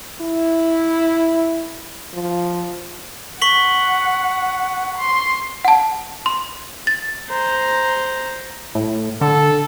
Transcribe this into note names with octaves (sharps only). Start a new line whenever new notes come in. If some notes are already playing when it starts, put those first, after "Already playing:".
E4
F3
F#5 C#6 B6 F#7
C6
F#5 A5
C6
A6
C5 A#5
A2
D3 A4